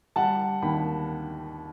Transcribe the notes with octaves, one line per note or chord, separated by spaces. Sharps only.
G3 F#5 A5
D#2 G5 B5